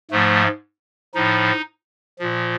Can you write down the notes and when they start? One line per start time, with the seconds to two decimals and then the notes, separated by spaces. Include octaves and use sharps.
0.11 G#2 F3 A3
1.15 A2 F3 D#4
2.19 A#2 F3